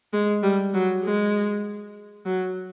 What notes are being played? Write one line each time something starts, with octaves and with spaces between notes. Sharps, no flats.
G#3
G3
F#3
G#3
F#3